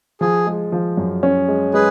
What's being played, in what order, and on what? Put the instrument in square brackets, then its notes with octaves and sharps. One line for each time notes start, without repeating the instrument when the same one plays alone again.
[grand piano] F3 [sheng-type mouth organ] G#4
[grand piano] G#3
F3
F#2
C#4
G#3
[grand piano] G#3 [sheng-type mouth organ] G#4 B4